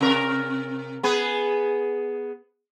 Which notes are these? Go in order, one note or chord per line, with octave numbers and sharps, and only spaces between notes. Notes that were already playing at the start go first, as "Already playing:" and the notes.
C3 A#4
B3 G#4 B4